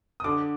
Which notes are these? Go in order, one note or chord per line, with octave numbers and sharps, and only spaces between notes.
D#6
D3 D6